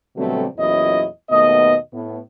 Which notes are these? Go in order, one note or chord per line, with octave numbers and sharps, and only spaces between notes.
B2 D3 F#3 G3 A3 C4
E2 A#2 F#3 C#4 E4 D#5
D#2 B2 A3 B3 D#5
A2 B3